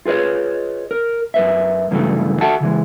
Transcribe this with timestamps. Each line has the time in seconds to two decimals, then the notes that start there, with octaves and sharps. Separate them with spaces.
0.05 F4 G#4 B4 C#5 D#5
0.91 A#4
1.34 F#2 B4 E5
1.91 G2 C#3 E3 F#3 G3 A3
2.41 F#4 A4 E5 F#5 A5
2.60 C#3 E3 G#3